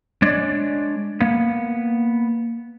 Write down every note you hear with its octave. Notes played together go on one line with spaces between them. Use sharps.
G#3 D4 C#5 D5
A#3 B3